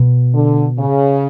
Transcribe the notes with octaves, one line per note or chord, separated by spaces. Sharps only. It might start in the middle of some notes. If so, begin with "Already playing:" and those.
Already playing: B2
D3
C#3